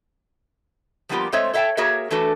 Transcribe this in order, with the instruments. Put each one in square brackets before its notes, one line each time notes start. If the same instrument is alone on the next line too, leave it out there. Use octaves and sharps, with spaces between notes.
[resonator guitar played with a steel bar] F3 G3 A#3 B3 F4 G4
G#3 A3 C4 C5 C#5 E5
A4 C#5 E5 F5 G5 A5
A#3 F#4 G#4 A#4 C#5 E5
E3 A3 D4 F#4 A4 B4